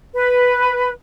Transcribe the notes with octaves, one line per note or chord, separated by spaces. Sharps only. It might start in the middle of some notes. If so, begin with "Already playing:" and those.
B4